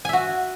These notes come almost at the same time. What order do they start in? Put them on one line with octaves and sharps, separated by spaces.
G#5 E5 F#4